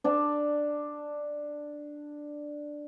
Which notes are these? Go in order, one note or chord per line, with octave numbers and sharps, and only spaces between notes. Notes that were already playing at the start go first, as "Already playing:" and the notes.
D4 D5 A5